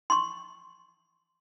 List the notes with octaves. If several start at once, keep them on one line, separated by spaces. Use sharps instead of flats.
C6 C#6